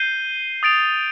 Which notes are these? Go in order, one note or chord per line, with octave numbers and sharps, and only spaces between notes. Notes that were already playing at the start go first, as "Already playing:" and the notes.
Already playing: G6 C7 D#7 G7
D#6 A6 D7 F7